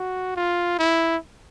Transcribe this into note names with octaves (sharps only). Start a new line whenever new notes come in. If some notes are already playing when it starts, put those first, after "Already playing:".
Already playing: F#4
F4
E4